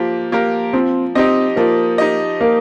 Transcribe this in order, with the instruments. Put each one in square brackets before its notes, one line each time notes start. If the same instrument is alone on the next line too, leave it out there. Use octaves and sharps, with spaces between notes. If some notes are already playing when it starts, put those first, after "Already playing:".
Already playing: [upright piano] F3 A#3 G4
A#3 G4 A#4
[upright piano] F3 [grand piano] C4
[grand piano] C4 [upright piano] D#4 G4 D#5
[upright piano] F3 [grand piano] A#3
[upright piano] D#4 G4 D#5
[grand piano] A#3